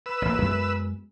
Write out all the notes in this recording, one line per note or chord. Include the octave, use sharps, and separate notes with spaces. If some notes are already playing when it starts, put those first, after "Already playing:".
B4 E6
A1 A#3
F#2 G#3 B3